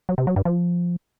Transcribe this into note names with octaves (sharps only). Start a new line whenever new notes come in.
F#3
C3
F#3
G2
F3